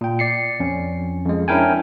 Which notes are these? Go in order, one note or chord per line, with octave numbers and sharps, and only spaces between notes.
A#2 G5
D5 C7 C#7
F2 C#4
F2 G#3
C#4 D4 E4 A#4 G5 G#5